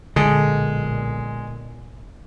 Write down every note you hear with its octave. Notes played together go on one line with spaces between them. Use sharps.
B1 A#2 D3 G#3